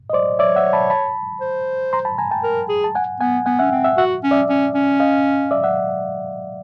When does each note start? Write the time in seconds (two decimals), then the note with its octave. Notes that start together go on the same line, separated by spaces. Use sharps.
0.10 D#5
0.13 C5 D5
0.39 C#5 D5 E5
0.56 E5 F#5
0.73 A5 B5
0.90 A5 B5
1.41 C5
1.93 A#5 C6
2.05 A5 B5
2.18 G#5 A#5
2.31 G5 A5
2.43 A#4
2.69 G#4
2.84 A5
2.95 F#5 G#5
3.21 B3 F#5 G#5
3.46 B3 F#5 G#5
3.59 C#4 E5 F#5
3.71 C4
3.84 E5 F#5
3.97 F#4 E5 F#5
4.24 C#4
4.31 D5 E5
4.49 C#4
4.75 C#4
5.00 D#5 F5
5.51 D5 E5
5.63 E5 F#5